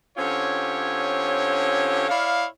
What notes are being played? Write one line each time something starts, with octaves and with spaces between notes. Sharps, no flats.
D3 C4 C#4 F4 G4 C#5
E4 C#5 D5 F5